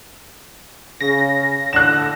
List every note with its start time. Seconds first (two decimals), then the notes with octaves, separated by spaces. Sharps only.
1.01 C#3 A#6
1.73 A2 D3 F#6 E7